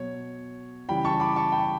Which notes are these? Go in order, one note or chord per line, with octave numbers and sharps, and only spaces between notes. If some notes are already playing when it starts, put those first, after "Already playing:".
Already playing: B2 F#3 C#5
C#3 E3 G3 G5 B5
A5 C#6
B5 D6
A5 C#6
G5 B5